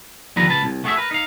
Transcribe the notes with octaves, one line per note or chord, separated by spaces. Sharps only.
D#2 D3 F3 G3 B4 A#5
C#2 B4 A5
C2
A3 F#4 G#4 C#5 E5
A#4 B4
D#4 F5